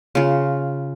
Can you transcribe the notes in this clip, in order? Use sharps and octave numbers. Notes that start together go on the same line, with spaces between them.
C#3 F4